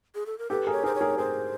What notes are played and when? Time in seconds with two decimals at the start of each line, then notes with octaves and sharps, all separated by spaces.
0.15 G#4
0.26 A4
0.38 A#4
0.50 G4 A4 B4
0.67 G#4 A#4
0.72 C#5
0.84 G#4 A#4 C5
0.95 C#5
1.01 G#4 A#4
1.18 G#4 A#4 C5